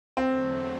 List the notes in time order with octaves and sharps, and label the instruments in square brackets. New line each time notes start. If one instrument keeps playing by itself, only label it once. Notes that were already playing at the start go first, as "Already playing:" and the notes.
[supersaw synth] E2 D3 F#3 A3 [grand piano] C4